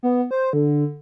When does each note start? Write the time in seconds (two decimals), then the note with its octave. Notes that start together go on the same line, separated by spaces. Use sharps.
0.03 B3
0.31 C5
0.53 D3